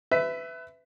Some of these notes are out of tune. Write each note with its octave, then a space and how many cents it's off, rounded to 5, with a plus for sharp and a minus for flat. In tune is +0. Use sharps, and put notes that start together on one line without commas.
B4 +25 E5 +0